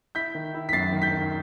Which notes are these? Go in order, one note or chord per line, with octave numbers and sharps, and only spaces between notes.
E4 G6 B6
D#3
E4
B6
F#2 A6 C7
D#3
G6 B6
D#3